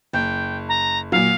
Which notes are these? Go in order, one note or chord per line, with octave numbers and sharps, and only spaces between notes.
F#1 G5
A#5
A#2 F#3 F5